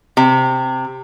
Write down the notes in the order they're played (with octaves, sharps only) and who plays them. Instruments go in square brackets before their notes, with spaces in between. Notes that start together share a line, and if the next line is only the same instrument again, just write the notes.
[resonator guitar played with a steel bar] C3